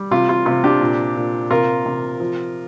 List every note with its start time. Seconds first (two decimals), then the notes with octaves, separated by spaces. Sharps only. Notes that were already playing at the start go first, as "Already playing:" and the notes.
Already playing: G3
0.11 C3 F4
0.29 F4
0.46 C3 F4
0.64 D4 G4
0.81 A#2
1.16 A#2
1.51 C3 F4 A#4
1.86 C3
2.20 F3